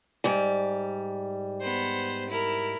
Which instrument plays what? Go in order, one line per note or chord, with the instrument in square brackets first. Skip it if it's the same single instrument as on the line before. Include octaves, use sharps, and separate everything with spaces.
[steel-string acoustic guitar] G#2 G3
[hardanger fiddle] B3 C5
E4 A#4